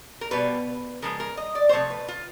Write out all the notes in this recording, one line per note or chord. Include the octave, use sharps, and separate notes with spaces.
A#4
B2 G3 B4
C#3 F3 G#3 A#4
A#4
D#5
D5
C5
C3 F3 A3 C#5
B4
F4